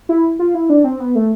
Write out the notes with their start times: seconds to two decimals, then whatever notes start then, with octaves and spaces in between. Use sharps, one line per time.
0.09 E4
0.39 F4
0.54 E4
0.70 D4
0.84 C4
1.00 B3
1.15 A3